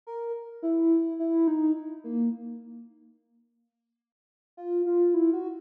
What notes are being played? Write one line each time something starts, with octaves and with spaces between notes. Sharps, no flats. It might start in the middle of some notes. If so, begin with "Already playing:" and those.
A#4
E4
E4
D#4
A#3
F4
F4
E4
F#4